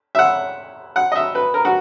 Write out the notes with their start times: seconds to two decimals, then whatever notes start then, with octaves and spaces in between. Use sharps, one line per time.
0.15 E5
0.19 F#5
0.96 F#5
1.12 D#5
1.15 E5
1.35 B4
1.54 A#4
1.65 F#4